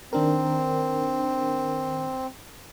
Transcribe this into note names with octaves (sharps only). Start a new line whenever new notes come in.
D#3 C4 D4 A#4